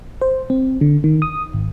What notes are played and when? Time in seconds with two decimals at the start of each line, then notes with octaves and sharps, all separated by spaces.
0.21 C5
0.50 C4
0.81 D3
1.04 D#3
1.22 D#6
1.53 G#1